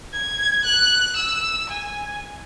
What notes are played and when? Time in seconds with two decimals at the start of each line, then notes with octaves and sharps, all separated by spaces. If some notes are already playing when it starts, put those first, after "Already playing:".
0.13 G#6
0.65 F#6
1.16 E6
1.69 G#5